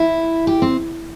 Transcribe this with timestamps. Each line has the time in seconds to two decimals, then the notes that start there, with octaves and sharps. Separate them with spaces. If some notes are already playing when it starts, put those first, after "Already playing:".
Already playing: E4
0.47 G4
0.62 C4